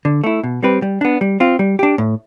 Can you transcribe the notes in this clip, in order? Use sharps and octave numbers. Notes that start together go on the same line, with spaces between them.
D3
A3 E4
B2
G3 C4 G4 B4
G3
B3 D4
G3
C4 F4
G3
D4 G4
A2